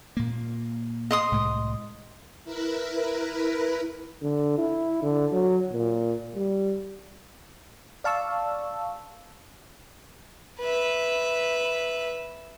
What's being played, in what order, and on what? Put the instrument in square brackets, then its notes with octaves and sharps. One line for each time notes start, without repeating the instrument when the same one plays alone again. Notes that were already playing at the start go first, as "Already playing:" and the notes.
[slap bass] A#2 A#3
[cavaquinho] D#5 C6 D#6
[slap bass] C2 A2 G#3
[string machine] E4 A#4 B4
[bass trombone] D3
E4
D3
F#3
A#2
G3
[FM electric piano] D5 F5 A5 C#6 E6
[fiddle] B4 E5